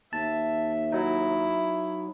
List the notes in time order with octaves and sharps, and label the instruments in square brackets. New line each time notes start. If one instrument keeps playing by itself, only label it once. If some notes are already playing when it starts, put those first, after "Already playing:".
[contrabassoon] D#2 [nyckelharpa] E5 [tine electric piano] A5
[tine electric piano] F#3 D#4 [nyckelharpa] E4